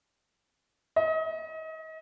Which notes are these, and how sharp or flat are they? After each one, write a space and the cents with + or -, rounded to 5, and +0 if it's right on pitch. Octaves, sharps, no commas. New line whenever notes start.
D#5 +35